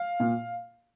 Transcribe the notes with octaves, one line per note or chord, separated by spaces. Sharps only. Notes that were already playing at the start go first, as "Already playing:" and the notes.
Already playing: F5
A#2